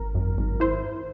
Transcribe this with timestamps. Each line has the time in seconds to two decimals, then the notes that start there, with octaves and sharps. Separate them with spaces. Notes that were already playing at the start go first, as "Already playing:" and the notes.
Already playing: G#1 A#4
0.15 F#2
0.38 G#1
0.60 E4 C5